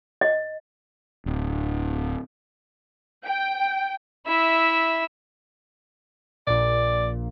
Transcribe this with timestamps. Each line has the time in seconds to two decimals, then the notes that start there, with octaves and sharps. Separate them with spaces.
0.21 D#5
1.26 D1
3.25 G5
4.26 E4 E5
6.47 A#1 A#2 D5